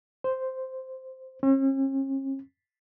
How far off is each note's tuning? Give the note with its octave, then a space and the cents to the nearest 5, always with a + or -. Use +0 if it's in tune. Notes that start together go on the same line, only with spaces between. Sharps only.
C5 -5
C#4 -45